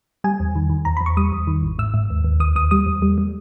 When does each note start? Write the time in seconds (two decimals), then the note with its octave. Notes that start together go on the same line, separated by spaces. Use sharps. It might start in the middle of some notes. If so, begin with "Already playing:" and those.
0.24 G3 G#5
0.40 E2
0.55 D#3
0.70 D#3
0.85 E2 A#5
0.97 B5
1.01 E2
1.06 C#6
1.17 G3 D#6
1.32 E2
1.47 D#3
1.63 G#1
1.79 G#2 E6
1.94 G#2
2.10 D#2
2.24 D#2
2.40 D#2 D#6
2.56 D#2 D#6
2.71 G3 D#6
2.86 E2
3.02 G3
3.18 G3